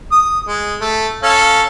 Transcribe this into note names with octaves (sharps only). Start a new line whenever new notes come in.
D#6
G#3
A3
C#4 A4 F5